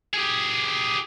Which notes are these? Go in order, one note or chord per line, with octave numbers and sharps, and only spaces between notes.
G4 G#4